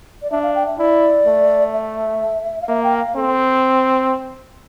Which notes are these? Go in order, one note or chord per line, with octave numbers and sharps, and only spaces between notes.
D5
D4 E5
F5
G5
E5
E4 D5
A3
E5
F5
A#3 E5
G5
F5
C4 A4